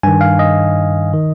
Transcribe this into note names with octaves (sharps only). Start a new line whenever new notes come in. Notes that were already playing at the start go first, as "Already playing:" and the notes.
G2 D#3 G#5
F5
D#5
D#3